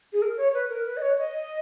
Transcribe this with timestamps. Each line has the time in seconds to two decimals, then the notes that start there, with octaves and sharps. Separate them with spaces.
0.13 G#4
0.22 A#4
0.37 C#5
0.54 B4
0.69 A#4
0.85 B4
0.97 D#5
1.02 C#5
1.18 D#5